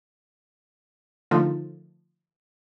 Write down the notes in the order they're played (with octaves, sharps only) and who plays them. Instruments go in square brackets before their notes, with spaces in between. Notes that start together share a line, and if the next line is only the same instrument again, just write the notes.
[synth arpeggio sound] D3 D#3 F3 A3 F4 A4